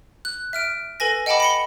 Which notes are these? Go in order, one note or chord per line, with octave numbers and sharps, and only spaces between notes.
F#6
E5 F6 D7
A4 B4 G#5 A#6
D#5 F#5 G5 A5 B5 D6
B5 C#7 G7